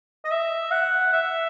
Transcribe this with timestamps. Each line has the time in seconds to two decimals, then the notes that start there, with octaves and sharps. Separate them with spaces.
0.25 D#5
0.31 E5
0.71 F#5
1.13 E5